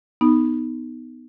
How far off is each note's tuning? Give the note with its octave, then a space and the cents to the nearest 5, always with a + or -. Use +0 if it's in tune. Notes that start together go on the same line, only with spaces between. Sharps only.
B3 +10 D#4 +0